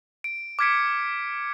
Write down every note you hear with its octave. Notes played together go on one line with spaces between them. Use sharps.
D7
D6 F6 G#6 B6 C#7 D7